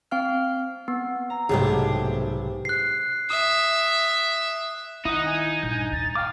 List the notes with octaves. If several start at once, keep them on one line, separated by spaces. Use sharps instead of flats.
C4 F5 F6
B3
A#5
B1 G#2 C3 A3 G4 G#4
F#6 C7
E5 D#6
D#3 D#4 E4 F#5 D#6
G#5
A#1 G2 G6
D#2 A6
F5 G5 D6